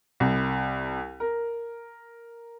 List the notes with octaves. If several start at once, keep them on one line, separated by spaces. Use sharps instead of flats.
C2
A#4